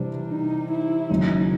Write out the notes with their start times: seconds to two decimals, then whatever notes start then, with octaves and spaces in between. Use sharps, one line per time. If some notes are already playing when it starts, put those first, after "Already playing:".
Already playing: C3 E3 G3 D4
0.31 D#4
0.71 E4
1.09 F#1 F#2 D#3 G#3 D#4